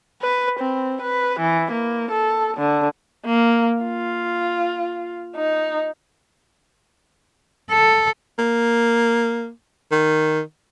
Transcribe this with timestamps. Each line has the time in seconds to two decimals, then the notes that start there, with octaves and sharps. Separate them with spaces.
0.22 B4
0.59 C4
1.02 B4
1.40 E3
1.72 A#3
2.11 A4
2.57 D3
3.26 A#3
3.83 F4
5.36 D#4
7.71 A4
8.39 A#3
9.91 D#3